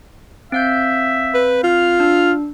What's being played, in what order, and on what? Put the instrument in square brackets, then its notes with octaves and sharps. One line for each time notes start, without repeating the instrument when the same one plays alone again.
[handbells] C4 F5 G6 [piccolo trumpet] E5
[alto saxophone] B4
[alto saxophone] F4 [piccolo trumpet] F6
[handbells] D4